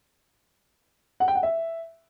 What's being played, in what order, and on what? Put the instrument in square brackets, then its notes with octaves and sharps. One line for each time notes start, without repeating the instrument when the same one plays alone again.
[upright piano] F#5
G5
F#5
E5